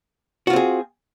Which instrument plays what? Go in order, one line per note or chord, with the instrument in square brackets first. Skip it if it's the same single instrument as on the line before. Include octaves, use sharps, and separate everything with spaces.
[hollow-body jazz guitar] F#4
F4
C4
G#4